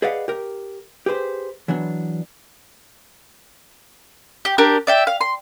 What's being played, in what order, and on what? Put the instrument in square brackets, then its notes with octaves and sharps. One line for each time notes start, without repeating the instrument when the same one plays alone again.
[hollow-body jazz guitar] G#4 B4 D5 D#5 F5 F#5
G4 A#4
G4 G#4 B4 C5
E3 F#3 B3 D4
[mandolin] G4
D4 G4 A#4
D5 E5 G5
F5
C6